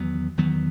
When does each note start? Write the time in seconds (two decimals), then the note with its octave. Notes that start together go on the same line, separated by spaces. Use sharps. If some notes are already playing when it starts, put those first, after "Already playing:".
Already playing: E2 D#3 F#3 B3
0.37 E2 D#3 F#3 B3